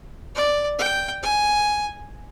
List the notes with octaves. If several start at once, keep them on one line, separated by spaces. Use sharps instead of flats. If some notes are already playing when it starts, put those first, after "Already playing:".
D5
G5
G#5